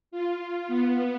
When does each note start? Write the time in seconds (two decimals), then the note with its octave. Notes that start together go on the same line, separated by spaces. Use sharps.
0.11 F4
0.68 B3